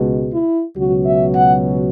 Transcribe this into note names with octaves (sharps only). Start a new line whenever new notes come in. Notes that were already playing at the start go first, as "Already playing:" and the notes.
Already playing: C#2 B2 G#3
E4
C#2 B2 F#3 F#4
E5
F#5